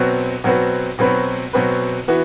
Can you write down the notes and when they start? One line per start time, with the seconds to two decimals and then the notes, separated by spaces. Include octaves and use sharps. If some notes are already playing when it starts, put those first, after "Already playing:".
Already playing: B2 F#3 C4 F#4 B4
0.44 B2 F#3 C4 F#4 B4
0.99 B2 F#3 C4 F#4 B4
1.53 B2 F#3 C4 F#4 B4
2.08 E3 B3 F#4